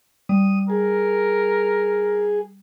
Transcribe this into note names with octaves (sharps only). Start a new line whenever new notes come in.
G3 D#6
G#4 A#4